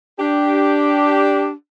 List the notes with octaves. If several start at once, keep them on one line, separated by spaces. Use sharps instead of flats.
D4 G4